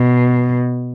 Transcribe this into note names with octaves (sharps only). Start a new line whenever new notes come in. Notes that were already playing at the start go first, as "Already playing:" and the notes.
Already playing: B2